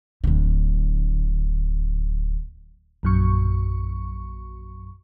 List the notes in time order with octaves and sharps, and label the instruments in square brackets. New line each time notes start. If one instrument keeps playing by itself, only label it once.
[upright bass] D1 D3
[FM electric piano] A#1 F#2 C#6